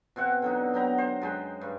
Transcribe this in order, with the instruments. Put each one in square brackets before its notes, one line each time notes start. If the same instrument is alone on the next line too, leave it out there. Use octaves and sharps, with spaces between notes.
[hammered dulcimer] B2 C4 F#5
D3 F#3 D#4
F#3 B3 G5 A#5
C5
F#2 G#3 G5
G2